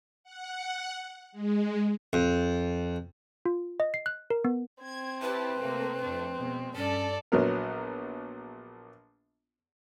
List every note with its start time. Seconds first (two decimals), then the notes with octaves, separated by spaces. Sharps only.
0.24 F#5
1.32 G#3
2.13 F2
3.46 F4
3.80 D#5
3.94 C7
4.06 F#6
4.30 A#4
4.45 B3
4.84 C4 G#6
5.22 E4 G4 B4 A5
5.59 C3 A3 A#3
6.01 F2 A3 D4
6.36 B2 G#3
6.76 G2 C#4 A4 D5
7.32 A#1 F#3 B3 A#4